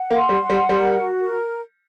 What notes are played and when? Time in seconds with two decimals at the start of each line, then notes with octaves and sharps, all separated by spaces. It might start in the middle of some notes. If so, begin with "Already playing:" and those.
Already playing: F#5
0.10 A#3
0.16 C6
0.29 G3
0.43 F#5
0.50 G3
0.69 G3 A#4
0.96 F#4
1.22 A#4